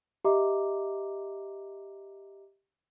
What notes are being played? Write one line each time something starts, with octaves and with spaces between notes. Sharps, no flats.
G4 D#5 E5 A#5 D6